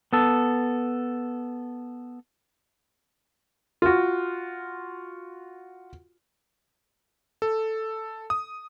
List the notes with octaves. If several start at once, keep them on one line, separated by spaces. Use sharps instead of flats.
B3 A4
F4 F#4
A4
D#6